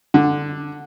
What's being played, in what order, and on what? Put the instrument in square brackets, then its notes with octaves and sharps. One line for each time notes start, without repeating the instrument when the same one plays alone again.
[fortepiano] D3